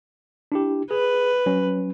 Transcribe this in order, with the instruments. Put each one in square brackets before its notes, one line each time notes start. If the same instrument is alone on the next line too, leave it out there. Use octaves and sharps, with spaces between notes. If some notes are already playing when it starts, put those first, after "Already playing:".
[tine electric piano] D4 E4 G4
[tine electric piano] G#4 [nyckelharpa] B4
[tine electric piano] F#3 C#4